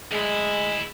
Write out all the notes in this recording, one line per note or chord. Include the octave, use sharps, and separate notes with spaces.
D2 G#3 E4